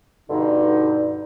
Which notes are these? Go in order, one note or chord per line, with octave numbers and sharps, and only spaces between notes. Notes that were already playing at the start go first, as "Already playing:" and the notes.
G2 B2 D3 D#4